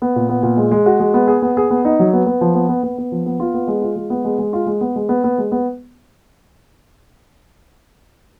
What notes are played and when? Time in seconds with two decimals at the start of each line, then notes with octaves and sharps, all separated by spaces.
0.02 B3
0.16 A#2
0.29 B3
0.43 A#2
0.57 G#3
0.71 G#3
0.86 F#4
1.00 G#3
1.14 B3
1.28 G#4
1.42 B3
1.57 G#4
1.70 B3
1.85 D#4
1.99 F#3
2.13 B3
2.26 B3
2.41 F3
2.55 B3
2.69 B3
2.83 B3
2.98 B3
3.12 F3
3.26 B3
3.40 F4
3.54 B3
3.68 G#3
3.82 F4
3.96 G#3
4.10 B3
4.25 G#3
4.38 G#3
4.53 F4
4.66 G#3
4.81 B3
4.96 G#3
5.09 B3
5.24 B3
5.38 G#3
5.52 B3